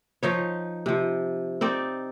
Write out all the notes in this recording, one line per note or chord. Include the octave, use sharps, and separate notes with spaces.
F3 D#4 C#5
C3 F3
C4 D#4 D5